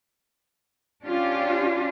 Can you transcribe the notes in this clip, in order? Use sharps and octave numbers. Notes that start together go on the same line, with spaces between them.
C#4 D4 F4 G4